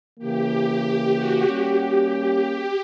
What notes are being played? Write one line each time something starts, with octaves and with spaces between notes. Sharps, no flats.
C#3 E3 A#3 G4
F#4
G3 A#3 C#4 G4